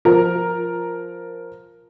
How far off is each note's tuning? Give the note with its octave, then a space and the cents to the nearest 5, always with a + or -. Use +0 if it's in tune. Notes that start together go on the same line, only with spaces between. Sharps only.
F3 +0 A#4 +0 A#5 +0